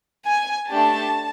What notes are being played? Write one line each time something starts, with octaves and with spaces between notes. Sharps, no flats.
G#5
A3 D4 G4 A5